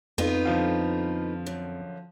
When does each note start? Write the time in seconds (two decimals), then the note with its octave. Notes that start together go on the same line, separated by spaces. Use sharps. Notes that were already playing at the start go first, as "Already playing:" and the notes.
0.18 F2 B3 D#4 F4
0.46 D3 F3 F5
1.46 F#2